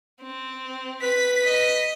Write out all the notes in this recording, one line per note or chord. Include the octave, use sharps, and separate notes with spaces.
C4
B4 B6
D#5